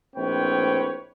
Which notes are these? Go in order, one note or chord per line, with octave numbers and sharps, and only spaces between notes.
A#1 A2 C4 B4 C#5 G5